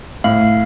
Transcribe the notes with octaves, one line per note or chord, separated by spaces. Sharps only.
A2 F5